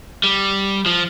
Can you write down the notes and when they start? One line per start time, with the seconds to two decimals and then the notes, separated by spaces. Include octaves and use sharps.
0.24 G3
0.86 F3